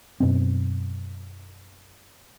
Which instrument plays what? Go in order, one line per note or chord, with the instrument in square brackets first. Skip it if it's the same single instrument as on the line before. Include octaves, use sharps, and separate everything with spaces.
[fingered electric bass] F#2 B2 B3 C4